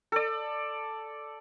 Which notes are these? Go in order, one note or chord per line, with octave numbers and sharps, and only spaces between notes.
A4 D5